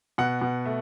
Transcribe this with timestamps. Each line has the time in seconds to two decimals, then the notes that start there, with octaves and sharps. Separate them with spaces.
0.18 B2 F#5
0.42 B2
0.65 A3